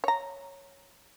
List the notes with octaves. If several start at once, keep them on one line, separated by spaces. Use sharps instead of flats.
C#5 A#5